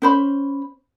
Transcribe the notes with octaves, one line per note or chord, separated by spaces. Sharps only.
C#4 C5 B5